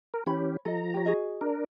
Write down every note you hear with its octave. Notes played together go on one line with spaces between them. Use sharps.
A#4
E3 C#4 G4 C#5 B5
F3 A4 D#5 A#5
G4 C#5
F#4 G#4 D#5
D4 A#4